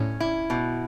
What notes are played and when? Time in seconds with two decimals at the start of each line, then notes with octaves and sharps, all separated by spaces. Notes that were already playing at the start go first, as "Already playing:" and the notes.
Already playing: A2 C#4
0.20 E4
0.50 B2